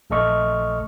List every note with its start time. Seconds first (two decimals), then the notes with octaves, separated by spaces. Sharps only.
0.10 A#1 A3 A4 D#5 C#6 F6